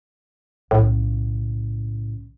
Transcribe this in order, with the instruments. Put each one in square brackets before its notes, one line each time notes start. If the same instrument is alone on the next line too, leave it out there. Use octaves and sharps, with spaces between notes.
[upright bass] B1 C#3 [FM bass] A2